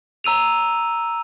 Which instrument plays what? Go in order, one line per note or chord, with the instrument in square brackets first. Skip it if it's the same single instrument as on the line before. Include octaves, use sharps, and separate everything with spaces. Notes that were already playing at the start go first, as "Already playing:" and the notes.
[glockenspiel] A#5 E6 D#7 F7